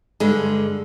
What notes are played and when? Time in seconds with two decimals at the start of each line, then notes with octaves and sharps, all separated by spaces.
0.20 G2 D3 G#3